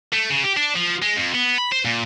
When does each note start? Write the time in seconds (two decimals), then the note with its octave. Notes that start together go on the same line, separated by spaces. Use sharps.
0.13 A3
0.31 C#3
0.44 G4
0.57 D4
0.76 F3
1.02 G#3
1.16 F2
1.34 B3
1.58 B5
1.72 C5
1.85 A#2